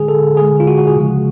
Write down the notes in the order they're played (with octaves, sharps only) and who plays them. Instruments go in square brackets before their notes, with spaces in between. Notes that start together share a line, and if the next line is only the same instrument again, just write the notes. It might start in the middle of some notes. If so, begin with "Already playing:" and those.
Already playing: [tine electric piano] D3 G#3 G#4
A4
D3 G#3 G#4
F4
F#4
F#4
G#4
C#3 F3 G#3